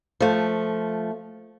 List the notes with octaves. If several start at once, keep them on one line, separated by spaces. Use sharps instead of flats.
F3 A3